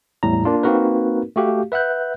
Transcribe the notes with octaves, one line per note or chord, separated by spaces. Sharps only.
E2 A2 G3 A#5
A#3 D4 F4
A#3 C4 D#4 F#4 A#4 B4
A3 F#4 G4 F5
B4 E5 F#5 F#6 G6